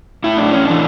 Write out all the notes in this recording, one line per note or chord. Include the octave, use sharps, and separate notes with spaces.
A2 E4
D4
C#4
E3 D4